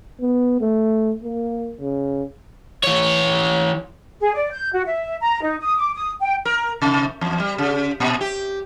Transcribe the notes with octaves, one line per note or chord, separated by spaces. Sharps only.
B3
A3
A#3
C#3
E3 C#5
G#4
D5
G6
F#4
E5
A#5
D#4
D#6
D6
D#6
G5
A#4
C3
E2
G3
C#3
A#2
G4